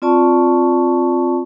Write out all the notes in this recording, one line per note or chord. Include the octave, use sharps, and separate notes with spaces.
C4 F4 D5 A5 C#6